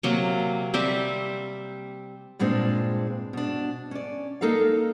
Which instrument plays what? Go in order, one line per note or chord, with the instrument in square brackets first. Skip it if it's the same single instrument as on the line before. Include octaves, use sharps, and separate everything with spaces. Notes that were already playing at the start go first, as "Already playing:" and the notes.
[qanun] C3 F#3 A#3
G3 C4 G4 E5
[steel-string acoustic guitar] G2 A#2 G#3 C4 D4
B2 D4
C#4 D5
A#3 D#4 A4 A#4 F5